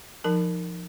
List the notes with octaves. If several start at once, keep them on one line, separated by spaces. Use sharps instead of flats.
F3 D#4 A#4 A5